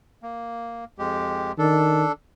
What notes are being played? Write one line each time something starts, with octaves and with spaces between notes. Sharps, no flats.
A#3
F2 G#3 G4
D#3 D4 A4